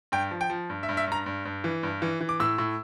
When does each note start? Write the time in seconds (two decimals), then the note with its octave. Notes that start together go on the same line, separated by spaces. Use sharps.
0.12 G2 G5
0.31 F3
0.41 G5
0.50 F3
0.70 G2
0.83 E5
0.89 G2
0.97 E5
1.07 G2 A#5
1.26 G2
1.45 G2
1.64 E3
1.83 G2
2.02 E3
2.21 E3
2.29 D6
2.40 A2 E6
2.58 A2